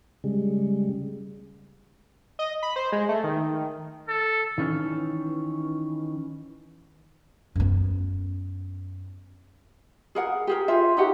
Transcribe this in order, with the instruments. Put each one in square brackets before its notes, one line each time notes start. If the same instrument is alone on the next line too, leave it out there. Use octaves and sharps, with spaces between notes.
[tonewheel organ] C#3 G3 G#3
[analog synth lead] D#5
B5
C5
G#3
A3
D#3
[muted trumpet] A4
[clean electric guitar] D#3 E3 C#4
[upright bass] F#2 B3
[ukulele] G#4 A#4 F#5
G4 G#4 A#4
F4 G#4 C5 E5
D#4 F#4 G4 F#5